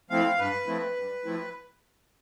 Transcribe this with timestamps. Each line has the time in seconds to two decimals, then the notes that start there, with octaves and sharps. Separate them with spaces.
0.10 F3 A3 C4 E4 F5
0.38 G2 B4
0.67 F3 A3 C4 E4
0.97 G2
1.25 F3 A3 C4 E4